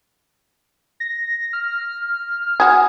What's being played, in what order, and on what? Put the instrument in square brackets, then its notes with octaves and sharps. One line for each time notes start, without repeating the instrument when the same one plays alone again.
[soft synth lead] A#6
F6
[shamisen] F#4 G#4